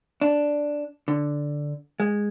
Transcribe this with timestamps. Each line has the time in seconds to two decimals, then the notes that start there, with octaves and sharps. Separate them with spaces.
0.21 D4
1.08 D3
2.00 G#3